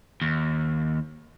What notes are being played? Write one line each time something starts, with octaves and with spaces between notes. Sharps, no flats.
D#2